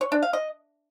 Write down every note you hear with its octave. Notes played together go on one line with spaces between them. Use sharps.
C#5
D4
F5
D#5